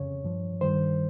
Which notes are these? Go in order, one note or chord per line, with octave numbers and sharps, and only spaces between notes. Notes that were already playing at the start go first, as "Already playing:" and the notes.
Already playing: F2 C#3 C#5
G2 F3
G2 D#3 G3 C5